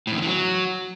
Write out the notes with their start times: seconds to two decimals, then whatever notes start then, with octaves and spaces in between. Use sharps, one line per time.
0.07 A2
0.12 E2
0.17 D3
0.22 E3
0.27 F#3